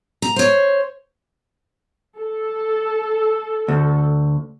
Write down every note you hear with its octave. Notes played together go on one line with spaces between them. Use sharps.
A#5
C5 C#5
A4
D2